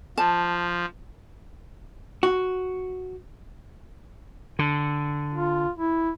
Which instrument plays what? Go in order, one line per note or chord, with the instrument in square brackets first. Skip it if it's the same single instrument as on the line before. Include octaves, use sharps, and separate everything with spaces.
[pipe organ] F3 [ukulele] A5
[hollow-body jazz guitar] F#4
[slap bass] D3
[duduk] F4
E4